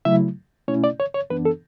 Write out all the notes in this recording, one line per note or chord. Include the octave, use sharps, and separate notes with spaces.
C#3 F#3 A3 E4 E5
B2 A3 C#4 E4 C#5
D5
C#5
C#5
F#2 E3 B3 D4 B4
A4